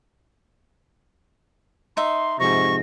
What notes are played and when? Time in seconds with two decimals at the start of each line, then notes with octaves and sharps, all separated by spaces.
1.97 D#4 E5 C6
2.40 F2 G#2 C3 C#6 A#6